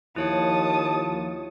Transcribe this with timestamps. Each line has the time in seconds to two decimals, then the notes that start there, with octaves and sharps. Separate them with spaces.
0.16 D#2 F3 E4 C#5 A5 D#6 C#7